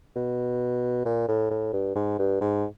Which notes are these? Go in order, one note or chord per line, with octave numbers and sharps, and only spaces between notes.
B2
A#2
A2
A2
G2
G#2
G2
G#2